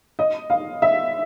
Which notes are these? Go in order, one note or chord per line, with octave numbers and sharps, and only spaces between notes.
D#5
F5
E5